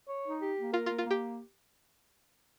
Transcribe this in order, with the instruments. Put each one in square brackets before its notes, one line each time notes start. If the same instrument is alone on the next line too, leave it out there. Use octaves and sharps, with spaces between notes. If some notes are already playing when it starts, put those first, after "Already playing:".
[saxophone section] C#5
D#4
G4
A#3
[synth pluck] F4 [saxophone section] A#4
[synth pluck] F4
[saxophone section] A#3
[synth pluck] F4
[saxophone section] A#3
[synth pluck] G4